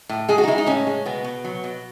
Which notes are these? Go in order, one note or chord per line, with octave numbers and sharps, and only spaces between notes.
A2
G#3 G#4
F#4
D#4
G#3 E4
D#4
A2 C#4
G#3
B2 B3
B2
F#3
B2